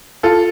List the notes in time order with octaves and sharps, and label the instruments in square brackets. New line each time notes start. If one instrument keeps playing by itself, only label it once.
[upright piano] F4 A4